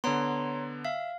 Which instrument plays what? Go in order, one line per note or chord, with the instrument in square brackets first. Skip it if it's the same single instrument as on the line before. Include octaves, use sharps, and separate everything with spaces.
[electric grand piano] D3 B3 [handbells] C#5 A#5 C6
[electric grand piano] E5 [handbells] F5